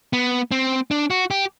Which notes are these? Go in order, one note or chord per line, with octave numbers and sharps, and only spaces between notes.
B3
C4
D4
F#4
G4